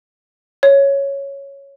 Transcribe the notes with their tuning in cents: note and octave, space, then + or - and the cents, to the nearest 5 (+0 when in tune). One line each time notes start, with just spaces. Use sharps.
C#5 +0